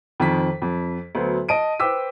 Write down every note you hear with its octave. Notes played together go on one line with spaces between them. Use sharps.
F2 D#3 C5 B6
F2
D2 F#3 B3 C5
D#5 A5 D7 D#7
B4 C5 G5 D6 E6 B6